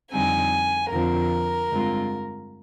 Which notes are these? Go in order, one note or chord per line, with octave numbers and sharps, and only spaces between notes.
F2 D3 G3 C4 D#4 G#5
F2 D3 F3 C4 A#4
G2 D3 G#3 C4 F4